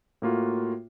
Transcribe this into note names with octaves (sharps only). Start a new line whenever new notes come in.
A2 A#3 F4 F#4